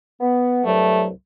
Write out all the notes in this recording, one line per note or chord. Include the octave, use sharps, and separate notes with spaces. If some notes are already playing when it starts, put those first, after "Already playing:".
B3
C2 G2 F#3 A3